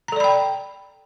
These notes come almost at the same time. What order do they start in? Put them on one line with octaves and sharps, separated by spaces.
A#5 A4 D5 B5 G5